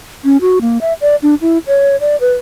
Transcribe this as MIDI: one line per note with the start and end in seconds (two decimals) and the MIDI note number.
0.24 0.37 61
0.41 0.59 66
0.61 0.78 58
0.81 0.93 76
1.01 1.16 74
1.22 1.35 62
1.41 1.58 64
1.67 1.96 73
2.01 2.16 74
2.21 2.33 71